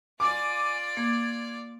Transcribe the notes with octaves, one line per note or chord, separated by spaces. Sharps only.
F4 D5 G#5 D6
A#3 G#6